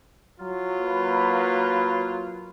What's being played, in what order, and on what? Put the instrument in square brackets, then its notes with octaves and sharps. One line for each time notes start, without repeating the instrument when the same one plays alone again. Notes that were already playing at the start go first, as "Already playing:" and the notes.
[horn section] F#3 F4
[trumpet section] A#3 B4 B5